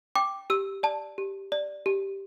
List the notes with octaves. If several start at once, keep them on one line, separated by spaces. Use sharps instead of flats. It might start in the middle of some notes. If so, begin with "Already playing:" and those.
G5 D6
G4 E6
D5 A5
G4
D5
G4